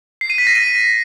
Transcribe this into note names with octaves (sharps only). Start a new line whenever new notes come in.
C7
D#7
B6
A#6
D#7